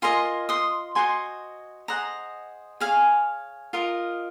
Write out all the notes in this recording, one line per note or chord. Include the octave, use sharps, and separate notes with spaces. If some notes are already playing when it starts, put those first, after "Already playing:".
F4 A#4 D#5 G#5 C6
C6 D#6
F#4 C5 D#5 G#5 C6
G#4 C5 D#5 F#5 A#5
G#4 C#5 F5 G#5
F4 A#4 D#5